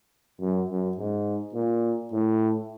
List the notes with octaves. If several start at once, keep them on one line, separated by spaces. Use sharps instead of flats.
F#2
F#2
G#2
A#2
A2